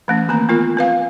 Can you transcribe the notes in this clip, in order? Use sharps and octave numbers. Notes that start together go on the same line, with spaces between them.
E3 A3 C#4
D#3 A#3 C4 A#5
B3 F4 A#4
C4 B4 F5